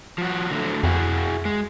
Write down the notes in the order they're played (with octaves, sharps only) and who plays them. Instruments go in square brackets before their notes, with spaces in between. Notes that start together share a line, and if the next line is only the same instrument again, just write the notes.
[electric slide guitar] F3 F#4
D3 F#3 A3
[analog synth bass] F2 [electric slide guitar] E4 F#4 G#4
[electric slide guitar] G#3